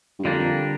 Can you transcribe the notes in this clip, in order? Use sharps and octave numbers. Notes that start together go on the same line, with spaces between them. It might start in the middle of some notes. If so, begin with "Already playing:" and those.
G2
F2 D3 G3 A#3 D4
F2